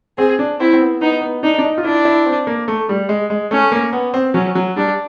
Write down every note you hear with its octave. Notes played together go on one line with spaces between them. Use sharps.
C4 G#4
D4
C4 E4
C4
B3
B3 D#4
B3
D4 D#4
D4
D#4
F4
D4 E4
E4
C4
A#3
A3
G3
G#3
G#3
A3 C#4
A#3
B3
C4
F#3 C#4
F#3
G3 D4